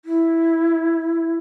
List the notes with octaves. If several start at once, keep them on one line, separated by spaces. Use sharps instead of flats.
E4